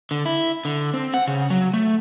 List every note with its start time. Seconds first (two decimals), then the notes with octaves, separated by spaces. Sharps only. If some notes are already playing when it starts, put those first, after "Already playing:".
0.11 D3
0.26 E4
0.65 D3
0.94 C4
1.14 F#5
1.28 C#3
1.50 F#3
1.73 A3